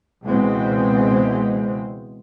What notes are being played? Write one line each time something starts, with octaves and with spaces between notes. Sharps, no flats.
C#2 B2 E3 G#3 C4